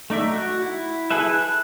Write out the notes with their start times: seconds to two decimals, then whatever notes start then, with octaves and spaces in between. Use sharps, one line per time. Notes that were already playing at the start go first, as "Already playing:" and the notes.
0.10 A3 D#4 D5 E5
0.32 F#4
0.62 E4
1.10 E4 G#4 A4 B4 E5
1.33 F#6